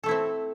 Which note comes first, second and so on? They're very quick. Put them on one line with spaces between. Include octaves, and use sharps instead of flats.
A4 A3 E4 C4